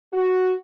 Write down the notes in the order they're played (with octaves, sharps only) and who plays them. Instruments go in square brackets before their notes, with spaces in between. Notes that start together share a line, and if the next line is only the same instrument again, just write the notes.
[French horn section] F#4